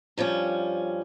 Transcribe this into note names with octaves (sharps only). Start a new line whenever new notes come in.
G2 F3 G3 C#4